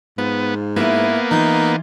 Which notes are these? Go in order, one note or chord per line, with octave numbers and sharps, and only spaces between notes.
G#2 B3 F4
A#3 B3 E4 B4
E3 D#4 F4